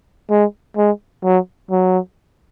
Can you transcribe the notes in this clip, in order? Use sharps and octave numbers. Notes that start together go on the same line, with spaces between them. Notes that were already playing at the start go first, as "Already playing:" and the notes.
G#3
G#3
F#3
F#3